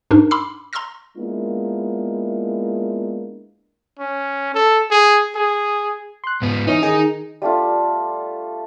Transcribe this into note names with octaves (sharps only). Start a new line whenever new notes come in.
G#2 D4 D#4 A#4
B5 C6 D6 E6 F6 C7
A#5 C6 C#6 E6 F6 A#6
G#3 A#3 B3 D4 E4 F4
C#4
A4
G#4
G#4
C6 F#6
G#2 B3
E3 C#4 D#4
D#3 G#4 D#5
G3 A3 D4 F4